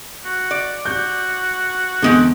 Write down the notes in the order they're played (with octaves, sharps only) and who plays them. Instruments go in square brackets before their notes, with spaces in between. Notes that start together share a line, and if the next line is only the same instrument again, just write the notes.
[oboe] F#4
[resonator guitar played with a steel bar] D5
[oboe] F#4 [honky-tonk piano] G6
[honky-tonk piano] E2 [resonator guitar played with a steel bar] D3 G#3 C4